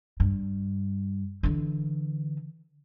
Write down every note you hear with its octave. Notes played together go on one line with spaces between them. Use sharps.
G2
D3 E3